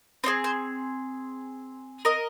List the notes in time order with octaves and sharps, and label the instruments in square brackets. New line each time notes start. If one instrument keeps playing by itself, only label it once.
[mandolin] C4 D#4 G#4 C5
C5
A#4 D#5